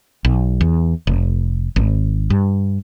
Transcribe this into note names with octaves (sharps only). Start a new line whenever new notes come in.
B1
E2
F1
G#1
G2